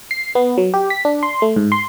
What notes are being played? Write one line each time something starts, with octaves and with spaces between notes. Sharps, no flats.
C7
B3
F#3
G4
B6
D4
C6
A3
G#2
C6